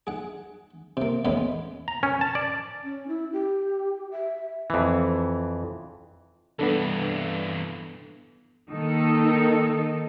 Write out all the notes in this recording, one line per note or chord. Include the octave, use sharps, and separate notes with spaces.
G#4 F#5
C3 A#3
D#2 A2 E3 G#3 B3 C#4
A#5
C#4
A5
D5
C#4
E4
G4
E5
F2 E3
G2 E3 B3 D4 A4
D#3 A#3 D#4 A4